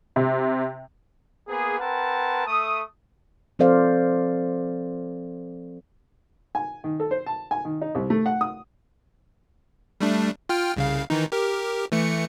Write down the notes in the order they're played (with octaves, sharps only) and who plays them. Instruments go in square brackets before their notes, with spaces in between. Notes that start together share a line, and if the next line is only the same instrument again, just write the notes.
[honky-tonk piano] C3
[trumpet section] A#3 B3 G#4
C4 A#4 B4 F#5 A5
A3 D#6
[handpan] F3 C4 A4 C5 D5 F5
[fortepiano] G#5
D#3
A4
C5
A5
G#5
D#3
D#4
C2
A3
F#5
D#6
[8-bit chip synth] G3 A3 D4
F4 G5 F6
C2 C#3 F5
D#3 E3 D#4
G4 A#4
E3 A3 C#7